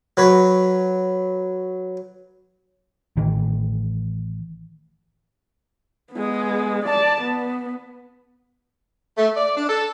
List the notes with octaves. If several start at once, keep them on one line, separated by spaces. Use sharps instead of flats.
F#3 B4 C#5
A1 D#3 E3
G#3 B3
D5 A5
B3
A3
D5
D4
A4